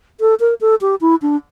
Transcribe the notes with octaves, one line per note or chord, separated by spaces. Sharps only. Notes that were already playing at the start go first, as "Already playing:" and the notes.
A4
A#4
A4
G4
E4
D4